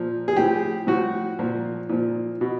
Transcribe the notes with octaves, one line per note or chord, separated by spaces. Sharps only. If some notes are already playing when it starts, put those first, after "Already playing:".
Already playing: A#2 F3
G#4
A2 F3 G4
A2 F3 F#4
A#2 F3
A#2 F3
B2